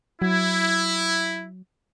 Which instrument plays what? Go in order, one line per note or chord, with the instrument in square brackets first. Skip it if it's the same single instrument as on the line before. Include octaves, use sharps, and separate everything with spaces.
[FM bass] F#3 [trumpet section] E4